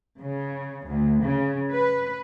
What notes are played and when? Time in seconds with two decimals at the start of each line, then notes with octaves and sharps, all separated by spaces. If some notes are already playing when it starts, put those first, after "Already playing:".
0.19 C#3
0.87 D2
1.23 C#3
1.72 B4